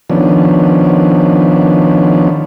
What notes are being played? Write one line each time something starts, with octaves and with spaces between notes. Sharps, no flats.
D#3 F3 B3 C#4 D4